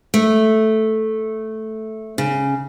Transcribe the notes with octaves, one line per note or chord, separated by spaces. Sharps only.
A3
C#3